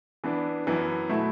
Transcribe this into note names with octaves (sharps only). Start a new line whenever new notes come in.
E3 B3 D4
F#2 E3 B3
B2 A3 E4